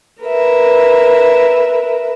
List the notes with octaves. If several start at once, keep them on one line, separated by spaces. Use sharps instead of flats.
A#4 B4 E5